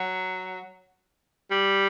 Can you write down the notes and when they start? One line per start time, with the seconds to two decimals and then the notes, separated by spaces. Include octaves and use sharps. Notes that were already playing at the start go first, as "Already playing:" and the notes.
Already playing: F#3
1.51 G3